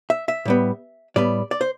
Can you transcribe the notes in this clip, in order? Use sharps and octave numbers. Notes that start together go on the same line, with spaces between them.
E5
E5
A2 G3 B3
A2 G3 B3 D5
D5
C5